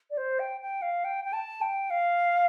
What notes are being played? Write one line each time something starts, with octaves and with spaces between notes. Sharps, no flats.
D5
C5
G5
G5
F5
G5
G5
A5
G5
F5